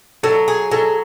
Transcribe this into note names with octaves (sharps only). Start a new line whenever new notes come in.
F#3 A4
G#4
F#3 A4